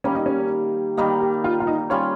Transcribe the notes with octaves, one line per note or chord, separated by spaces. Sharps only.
D#3 G3 A#3 C#4
D#4
C#4
D#3 G3 A#3 D#4
G4
F4
F4
D#4
G3 C#4 F4 C#5